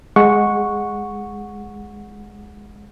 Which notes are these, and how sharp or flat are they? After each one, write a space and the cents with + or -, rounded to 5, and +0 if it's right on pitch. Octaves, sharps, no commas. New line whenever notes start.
G#3 +0 F#5 -15 C#6 +0